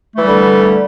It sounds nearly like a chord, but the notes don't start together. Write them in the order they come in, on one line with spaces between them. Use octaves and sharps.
A3 E3 G3 D3